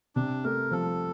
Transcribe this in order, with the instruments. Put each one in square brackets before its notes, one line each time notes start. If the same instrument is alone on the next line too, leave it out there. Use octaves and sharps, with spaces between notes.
[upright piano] C3 [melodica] D4
[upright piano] A3 [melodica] A#4
[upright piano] F3 [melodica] A4